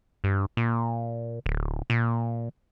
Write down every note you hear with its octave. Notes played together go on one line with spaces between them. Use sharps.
G2
A#2
D1
A#2